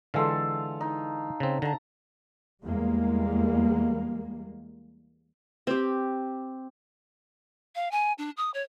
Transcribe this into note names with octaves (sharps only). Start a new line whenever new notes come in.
D3 E3 G#3 F4 A4 F5
D#4
C#3 C4
D3 A5 A#5
E2 G3 G#3 A#3
C4 G4
F5
G#5
D4
D#6
C#5